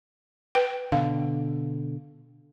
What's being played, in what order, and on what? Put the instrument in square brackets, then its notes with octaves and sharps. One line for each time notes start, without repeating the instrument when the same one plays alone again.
[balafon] B4 G5
[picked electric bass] B2 D3 [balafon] F5